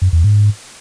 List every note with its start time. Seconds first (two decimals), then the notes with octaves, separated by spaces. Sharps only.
0.02 F#2
0.13 E2
0.24 G#2